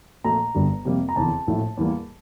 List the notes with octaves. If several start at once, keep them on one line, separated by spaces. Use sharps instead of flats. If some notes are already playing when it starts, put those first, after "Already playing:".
A#1 A#2 A3 A#5
G1 G2 D3 G3
F2 C3 G3 A#3
A#5
F1 E2 D3 A5
A#1 A2 F3 A3
E2 E3 G3 A#3